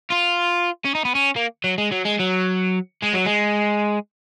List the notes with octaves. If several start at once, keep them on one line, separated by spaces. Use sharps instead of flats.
F4
C#4
D#4
B3
C#4
A#3
F#3
G#3
F#3
G#3
F#3
G#3
F#3
G#3